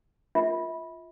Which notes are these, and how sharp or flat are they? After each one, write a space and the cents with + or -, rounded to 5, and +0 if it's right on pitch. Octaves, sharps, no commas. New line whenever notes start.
F4 +0 E5 -35